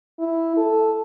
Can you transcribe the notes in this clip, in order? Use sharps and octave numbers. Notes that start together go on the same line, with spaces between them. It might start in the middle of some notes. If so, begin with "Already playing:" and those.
E4
A4